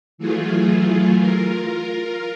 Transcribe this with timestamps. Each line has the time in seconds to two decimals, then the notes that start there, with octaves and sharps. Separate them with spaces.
0.18 E3 F#3 A3 F4 G#4
1.14 F4 A#4